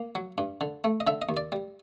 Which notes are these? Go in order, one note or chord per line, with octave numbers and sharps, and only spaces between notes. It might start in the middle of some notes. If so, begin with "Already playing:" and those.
Already playing: A#3
F#3
G2
D3
A3
D#5
D3 E5
D#5
D#2
D5
G3